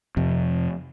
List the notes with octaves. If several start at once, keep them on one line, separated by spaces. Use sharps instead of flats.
F2 C3